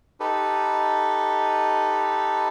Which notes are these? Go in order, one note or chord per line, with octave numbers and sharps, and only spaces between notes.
D#4 G4 A4 B4